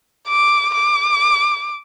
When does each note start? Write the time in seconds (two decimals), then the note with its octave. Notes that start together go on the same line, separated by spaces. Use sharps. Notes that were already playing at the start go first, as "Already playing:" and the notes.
0.29 D6
0.75 D6